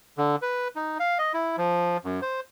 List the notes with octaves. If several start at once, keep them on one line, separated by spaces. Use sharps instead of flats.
D3
B4
D#4
F5
D#5
E4
F3
F#2
C5